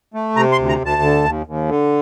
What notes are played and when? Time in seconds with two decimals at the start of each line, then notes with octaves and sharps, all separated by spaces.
0.14 A3
0.36 C3 A#5
0.52 C6
0.58 D2
0.69 A#5
0.81 D2 A5
1.02 D3
1.24 D#2
1.46 D#2
1.69 D3